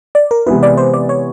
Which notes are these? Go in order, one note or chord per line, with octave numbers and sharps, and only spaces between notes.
D5
A#4
C3 E3 G#3 B3 E4 B4
D5
C5
D5
C#5